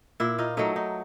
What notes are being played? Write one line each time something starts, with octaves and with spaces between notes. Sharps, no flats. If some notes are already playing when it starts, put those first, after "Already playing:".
A#2 E4
D#4 F4
F#3 A3 D#4
D#4